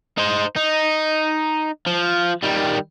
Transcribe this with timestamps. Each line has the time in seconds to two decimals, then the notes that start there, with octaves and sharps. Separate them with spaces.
0.18 D#4 C5
0.56 D#4
1.86 F3
2.43 D#3 G3